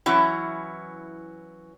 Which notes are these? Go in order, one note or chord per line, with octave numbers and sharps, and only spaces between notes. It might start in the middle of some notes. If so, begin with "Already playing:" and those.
E3 F#3 C#4 E4